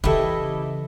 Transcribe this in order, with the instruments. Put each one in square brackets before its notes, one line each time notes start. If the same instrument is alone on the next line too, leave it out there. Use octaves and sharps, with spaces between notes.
[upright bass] C#3 E3 [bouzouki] E4 D#5 [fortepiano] G4 A4